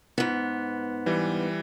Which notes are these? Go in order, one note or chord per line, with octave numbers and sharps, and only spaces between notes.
G#2 B3
E3 G3